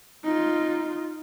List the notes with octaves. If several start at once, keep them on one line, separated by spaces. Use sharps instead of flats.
D#4 F4